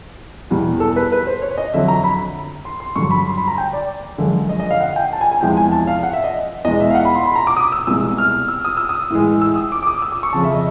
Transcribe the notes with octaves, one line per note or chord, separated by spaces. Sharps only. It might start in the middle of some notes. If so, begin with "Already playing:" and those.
E2 B2 G3
A4
B4
B4
C5
C#5
D#5
F2 D3 F#3 E5
A#5
B5
C6
C6
G2 D3 F#3 C#6
B5
C6
B5
A#5
G5
D5
F#2 D3 F3 G#3
D#5
D#5
F5
F#5
G5
A5
G#5
G#5
E2 C3 F3 G#3 G5
G#5
A5
F5
F#5
E5
D#5
E2 B2 G#3 D#5
E5
F5
F#5
B5
C6
B5
A#5
D6
D#6
E6
C2 B2 G#3 E6
F6
E6
D#6
E6
D#6
A2 E3 G#3
E6
D#6
D6
D6
D#6
E6
D6
C#6
F2 C#3 F3 A5
E5
D#5